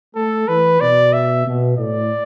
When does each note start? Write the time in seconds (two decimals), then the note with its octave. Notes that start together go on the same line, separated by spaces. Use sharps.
0.15 A3 A4
0.48 E3 B4
0.81 B2 D5
1.13 E5
1.46 B2
1.78 A2 D5